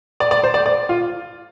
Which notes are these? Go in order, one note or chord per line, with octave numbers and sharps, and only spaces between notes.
D5
D5
C5
D5
D5
F4